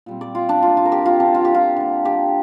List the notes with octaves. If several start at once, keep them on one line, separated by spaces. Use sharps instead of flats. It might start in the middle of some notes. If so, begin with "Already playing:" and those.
A#2 G3 C4
D5
F4
D4
C3 A#3 F4
F4
A#4
G4
F4
D3 F3 C4 D4
F4
G4
F4
D3 A#3
G4